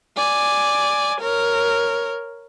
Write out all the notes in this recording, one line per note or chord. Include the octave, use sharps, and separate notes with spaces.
D5 G#5
A#4 C#5